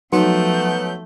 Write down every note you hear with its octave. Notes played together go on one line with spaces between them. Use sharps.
F3 F#3 A3 B3 D#4 G6